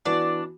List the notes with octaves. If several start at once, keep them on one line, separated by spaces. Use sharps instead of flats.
E3 B3 D4 F#4 D5